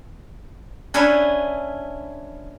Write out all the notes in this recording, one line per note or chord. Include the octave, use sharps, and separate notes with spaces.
C#4 D4 E4 B4 C#5 E5